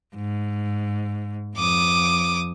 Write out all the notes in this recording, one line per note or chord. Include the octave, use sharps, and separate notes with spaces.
G#2
F2 D6 D#6